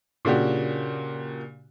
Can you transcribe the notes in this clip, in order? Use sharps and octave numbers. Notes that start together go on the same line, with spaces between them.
A#2 C#3 A#3 D4 F#4 G4